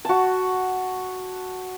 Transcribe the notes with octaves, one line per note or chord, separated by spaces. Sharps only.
F#4 A5